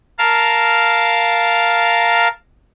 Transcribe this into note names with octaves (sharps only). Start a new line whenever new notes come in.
A#4 F5 A5